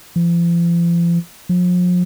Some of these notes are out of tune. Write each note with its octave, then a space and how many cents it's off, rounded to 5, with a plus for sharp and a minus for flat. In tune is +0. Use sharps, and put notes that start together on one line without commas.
F3 -40
F3 +40